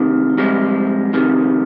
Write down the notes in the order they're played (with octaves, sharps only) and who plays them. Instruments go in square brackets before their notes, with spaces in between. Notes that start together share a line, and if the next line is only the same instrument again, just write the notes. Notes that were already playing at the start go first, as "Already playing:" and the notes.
Already playing: [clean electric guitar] D2 C3 D#3
C2 C3 F3 G#3
F2 C3 D#3